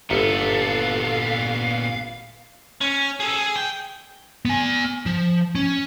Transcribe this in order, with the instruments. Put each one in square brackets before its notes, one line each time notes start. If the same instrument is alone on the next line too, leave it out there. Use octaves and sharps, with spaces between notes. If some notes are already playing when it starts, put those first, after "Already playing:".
[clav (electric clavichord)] G1 E5 A5 [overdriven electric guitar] A#2 B3 [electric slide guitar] A4 [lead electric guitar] F5
[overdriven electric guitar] C#4
G#4 A4
G#4
G5
[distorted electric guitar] B3 G#5
F3
C#4